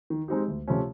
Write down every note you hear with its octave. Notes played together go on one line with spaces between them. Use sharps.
D#3
G#3 C4 D#4 G4
D2
C3 F3 A3 C#4